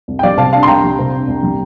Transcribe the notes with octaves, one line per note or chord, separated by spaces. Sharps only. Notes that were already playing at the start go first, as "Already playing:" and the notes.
C2
G5
G3 D5 F5
C3 F5 A5
D4 F5 A5
C6
C2 G5 A#5
G3
C3
D4
C2
G3